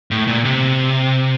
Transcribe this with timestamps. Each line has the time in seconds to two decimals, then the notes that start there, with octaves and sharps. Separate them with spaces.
0.11 A2
0.27 A#2
0.45 C3